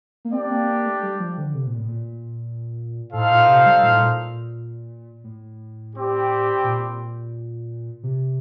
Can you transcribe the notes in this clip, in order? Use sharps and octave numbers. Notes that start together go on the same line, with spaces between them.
A#3
C4 D4 G4 D5 G5
A#3
A#3
A3
G3
F3
D3
C3
A#2
A2
A#2
A2 D#4 A4 C5 F5
A#2
C3
G3
A#2
A2
A#2
A2
G3 C4 G4
A#2
C3